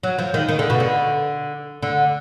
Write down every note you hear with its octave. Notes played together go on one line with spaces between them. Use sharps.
F#3
F3
D#3
D#3
D3
B2
D3
D3